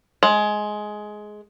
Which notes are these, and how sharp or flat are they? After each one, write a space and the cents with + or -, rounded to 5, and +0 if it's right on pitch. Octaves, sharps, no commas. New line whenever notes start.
G#3 +15